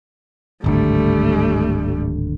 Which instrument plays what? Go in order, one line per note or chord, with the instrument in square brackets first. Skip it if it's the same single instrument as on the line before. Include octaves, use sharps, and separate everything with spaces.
[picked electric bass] D1 G#1 D3 [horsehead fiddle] G3 A3